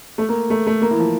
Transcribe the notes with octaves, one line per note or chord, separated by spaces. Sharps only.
A3
A#3
A3
A3
A#3
E3
F3